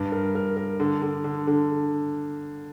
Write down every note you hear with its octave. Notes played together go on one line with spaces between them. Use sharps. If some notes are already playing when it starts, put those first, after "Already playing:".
Already playing: G2
A#4
A#4
A#4
D3
D3
D3
D3